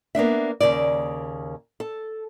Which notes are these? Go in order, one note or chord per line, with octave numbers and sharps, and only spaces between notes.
A#3 B3 D4 E5
D#2 C#3 A#3 D5
A4